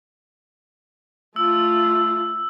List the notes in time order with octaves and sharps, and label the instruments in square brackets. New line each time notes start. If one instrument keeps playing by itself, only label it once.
[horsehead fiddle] A3 F4 [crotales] E6